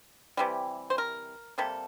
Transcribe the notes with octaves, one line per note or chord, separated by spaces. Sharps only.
C3 E3 G3
C5
A#4
C3 G3 A#3 A4